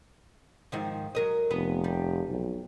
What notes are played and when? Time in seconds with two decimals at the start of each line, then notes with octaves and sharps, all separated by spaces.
0.72 G#2 D#3 F3
1.15 F#3 A#4 D#5
1.51 F1 B3
1.84 G3
2.29 B1